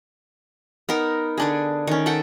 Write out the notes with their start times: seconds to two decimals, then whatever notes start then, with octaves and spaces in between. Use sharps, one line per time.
0.89 B3 D#4 A#4
1.38 D3 D4 G#4
1.87 D#3 C#4
2.06 A4 B4 F#5 G5